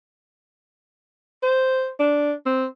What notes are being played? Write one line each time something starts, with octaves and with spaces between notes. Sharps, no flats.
C5
D4
C4